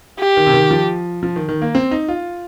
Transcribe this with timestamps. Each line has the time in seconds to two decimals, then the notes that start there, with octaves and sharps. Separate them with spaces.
0.20 G4
0.37 D#3
0.46 C3
0.53 D#3
0.71 F3
1.23 F3
1.36 D#3
1.49 D#3
1.62 A#3
1.75 C4
1.91 D#4
2.08 F4